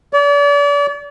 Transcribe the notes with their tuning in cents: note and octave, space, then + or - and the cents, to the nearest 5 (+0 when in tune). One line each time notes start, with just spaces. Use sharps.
D5 -40